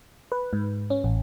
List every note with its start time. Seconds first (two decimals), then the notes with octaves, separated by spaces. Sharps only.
0.32 B4
0.53 G#2
0.90 C#4
1.04 A1